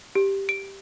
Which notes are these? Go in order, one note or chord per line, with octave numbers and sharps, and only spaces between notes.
G4
D7